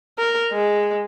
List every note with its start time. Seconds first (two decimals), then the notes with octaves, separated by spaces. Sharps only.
0.18 A#4
0.52 G#3